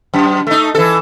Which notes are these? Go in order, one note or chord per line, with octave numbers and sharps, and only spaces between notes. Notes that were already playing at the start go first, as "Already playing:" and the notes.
F#2
A3 D#4
E3 A4